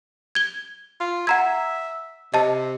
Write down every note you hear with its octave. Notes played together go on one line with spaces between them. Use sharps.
G#6 G7
F4
E5 F#5 A#5 G#6
C3 D#5 A5